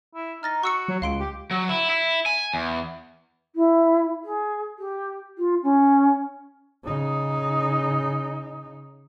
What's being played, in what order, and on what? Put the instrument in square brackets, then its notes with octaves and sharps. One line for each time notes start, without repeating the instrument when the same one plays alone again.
[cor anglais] E4
[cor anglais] D#4 [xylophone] F6 A6 A#6
[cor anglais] F#4 [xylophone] C#6 E6 C#7
[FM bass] F#3
[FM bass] C#2 [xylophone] F5 C6 D7
[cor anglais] G4
[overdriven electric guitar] F#3
E4
E4
G#5
E2
[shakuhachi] E4
G#4
G4
F4
C#4
[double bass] C#3 D#4